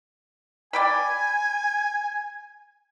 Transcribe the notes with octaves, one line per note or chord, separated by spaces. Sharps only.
D5 G5 G#5 B5